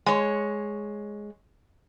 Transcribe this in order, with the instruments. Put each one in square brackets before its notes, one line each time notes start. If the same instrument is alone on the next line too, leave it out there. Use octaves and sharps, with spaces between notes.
[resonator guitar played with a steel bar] G#3 C#5